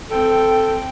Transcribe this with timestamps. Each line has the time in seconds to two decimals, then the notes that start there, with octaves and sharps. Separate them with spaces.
0.10 C4 A4 G5